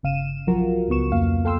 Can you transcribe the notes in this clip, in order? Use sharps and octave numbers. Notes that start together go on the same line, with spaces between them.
G1 C#3 F5 D#7 E7
B1 F3 F#3 F4 F#4 A#4
C#2 C#3 B3 C#6 E7
F2 A#3 F5
A4 F5 G5 C6 E6